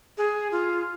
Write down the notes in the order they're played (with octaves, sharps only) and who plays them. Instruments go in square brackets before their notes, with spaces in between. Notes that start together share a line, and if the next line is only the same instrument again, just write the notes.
[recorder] G#4
F4